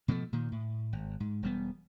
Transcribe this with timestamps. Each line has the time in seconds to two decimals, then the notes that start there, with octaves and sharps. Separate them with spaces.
0.08 B2 F3 F#3 A3
0.33 A#2 D#3
0.52 A2
0.93 G#1
1.20 G#2
1.43 E1 G3 B3